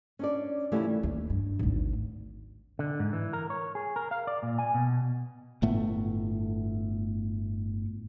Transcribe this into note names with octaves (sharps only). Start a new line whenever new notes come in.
C#4 D4 D5
C#3 E3 F3 G3 A3 C#4
D#2
G2
G#1 D2
D3
G#2
E3
A#4
C#5
G#4
A#4
F5
D5
A#2
G#5
B2
G1 A2 A3 B3